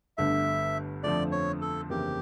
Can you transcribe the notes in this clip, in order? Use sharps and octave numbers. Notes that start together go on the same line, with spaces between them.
G1 G2 D3 A3 E5
F2 D3 F3 A3 D5
C#5
A4
G1 F2 C#3 E3 A#3 G4